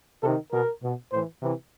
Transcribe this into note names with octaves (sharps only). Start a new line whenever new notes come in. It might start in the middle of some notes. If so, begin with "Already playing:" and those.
C3 D#3 A4
B2 A#4
B2
A2 E3 C5
C3 E3